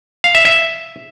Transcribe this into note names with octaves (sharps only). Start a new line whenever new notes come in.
F5
E5
E5